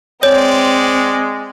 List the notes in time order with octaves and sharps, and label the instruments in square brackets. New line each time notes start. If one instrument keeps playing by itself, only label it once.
[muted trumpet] G#3 [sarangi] C4 [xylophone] C#5 [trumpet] D5